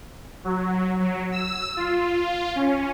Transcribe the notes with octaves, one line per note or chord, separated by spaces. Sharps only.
F#3
F#3
E6
F4
C#4